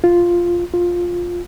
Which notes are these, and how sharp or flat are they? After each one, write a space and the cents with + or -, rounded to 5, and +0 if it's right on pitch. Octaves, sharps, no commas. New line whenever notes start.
F4 +0
F4 +10